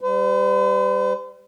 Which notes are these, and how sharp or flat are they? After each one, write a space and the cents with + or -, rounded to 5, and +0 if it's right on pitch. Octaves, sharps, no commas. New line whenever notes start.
G3 +0 C5 -45